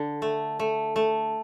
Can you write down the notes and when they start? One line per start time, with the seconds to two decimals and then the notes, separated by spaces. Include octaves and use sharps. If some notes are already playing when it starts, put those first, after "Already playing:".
Already playing: D3
0.22 A3
0.60 A3
0.96 A3